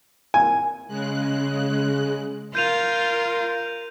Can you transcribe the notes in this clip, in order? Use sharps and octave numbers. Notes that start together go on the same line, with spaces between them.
G#5
C#3 G#3 F#6
F4 A#4 G6 D#7 F7